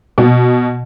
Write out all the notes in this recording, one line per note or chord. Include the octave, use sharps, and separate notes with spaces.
B2